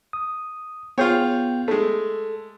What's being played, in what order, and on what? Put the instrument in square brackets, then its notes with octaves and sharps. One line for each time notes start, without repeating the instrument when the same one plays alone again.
[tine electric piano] D#6
[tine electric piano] B3 G5 G6 [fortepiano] F4 G#4 C#5
[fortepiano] G#3 A3 [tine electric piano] A4